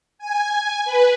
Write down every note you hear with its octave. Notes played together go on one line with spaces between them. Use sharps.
G#5
B4